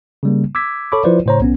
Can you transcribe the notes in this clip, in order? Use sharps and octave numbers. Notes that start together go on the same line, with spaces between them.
C#3 G3 A#3
D6 E6 G#6 B6
A4 C#5 B5 C#6 D6
F3 E4 F4 B4 C5 D5
A2 C#3 C5 C#5 A#5
B1 B3 C#4